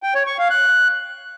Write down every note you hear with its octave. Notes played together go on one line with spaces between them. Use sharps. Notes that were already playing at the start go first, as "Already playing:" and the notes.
G5
C#5
C#6
F5
F#6